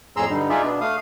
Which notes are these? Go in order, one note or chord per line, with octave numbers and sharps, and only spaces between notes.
F2 A2 G#4 A#5 C6 E6
G2 D3 G3 D#4
D#4 F4 G#4 D5 E5
B2 B3 D4
A3 F5 D#6